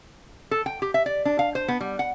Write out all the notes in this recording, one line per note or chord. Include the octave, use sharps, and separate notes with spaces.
A4
G5
G4
E5
D5
D4
F5
C5
B3
G3
F#5